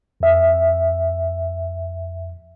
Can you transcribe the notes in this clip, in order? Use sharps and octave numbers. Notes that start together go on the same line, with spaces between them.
F2 E5